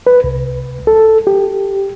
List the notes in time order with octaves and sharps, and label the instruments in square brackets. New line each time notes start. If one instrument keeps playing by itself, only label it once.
[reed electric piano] B4
C2
A4
G4